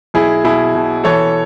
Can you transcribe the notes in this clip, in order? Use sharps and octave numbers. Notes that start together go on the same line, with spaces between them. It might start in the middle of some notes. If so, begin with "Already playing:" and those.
B1 E4 G#4
B2 E4 G#4
B2
E3 A4 C#5